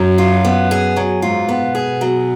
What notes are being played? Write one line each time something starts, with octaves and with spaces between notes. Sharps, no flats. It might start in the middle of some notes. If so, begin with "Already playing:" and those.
Already playing: F#2 F#3
F4
B3
G#4
F#3
G#2 F4
B3
B2
G#4
F#3